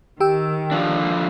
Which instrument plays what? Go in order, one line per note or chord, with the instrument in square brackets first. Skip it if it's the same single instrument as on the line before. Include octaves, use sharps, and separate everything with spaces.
[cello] D#3 [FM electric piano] G4 G5 E6
[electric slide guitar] D3 F3 D4